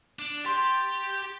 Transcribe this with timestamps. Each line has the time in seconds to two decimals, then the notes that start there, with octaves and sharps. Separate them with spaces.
0.19 D4
0.45 G4 G5 C6 A6